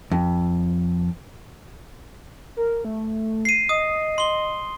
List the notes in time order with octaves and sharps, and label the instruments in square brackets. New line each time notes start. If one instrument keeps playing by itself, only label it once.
[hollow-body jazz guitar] F2
[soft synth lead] A#4
A3
[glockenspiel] C7 D#7
[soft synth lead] D#5 [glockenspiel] D#6
[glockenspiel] C6 G7